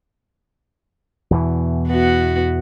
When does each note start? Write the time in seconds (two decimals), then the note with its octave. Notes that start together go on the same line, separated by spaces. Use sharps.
1.31 E2 B2 E3
1.89 B3 F#4